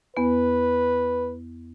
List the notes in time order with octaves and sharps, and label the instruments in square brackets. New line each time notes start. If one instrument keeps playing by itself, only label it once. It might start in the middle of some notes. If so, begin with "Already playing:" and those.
[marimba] E2 B3 [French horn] B4